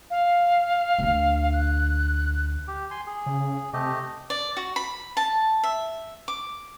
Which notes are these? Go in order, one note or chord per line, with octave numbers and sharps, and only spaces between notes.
F5
D2 D3
F#6
G4
G#5 C6
G#4
C#3
C3 A3 G4 D#5
D5
F#4
B5
A5
E5
D6